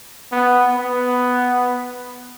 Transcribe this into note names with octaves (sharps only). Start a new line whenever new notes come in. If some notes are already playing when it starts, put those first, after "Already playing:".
B3
B3